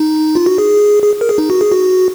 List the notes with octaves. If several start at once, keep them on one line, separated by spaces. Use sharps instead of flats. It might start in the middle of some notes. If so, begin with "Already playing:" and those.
Already playing: D#4
F4
F#4
G#4
G#4
A#4
G#4
D#4
F#4
G#4
F#4